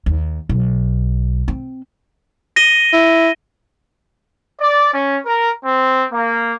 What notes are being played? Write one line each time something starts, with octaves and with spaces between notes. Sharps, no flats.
D#2
B1
C4
A#6 D#7 G7
E4
D5
C#4
A#4
C4
A#3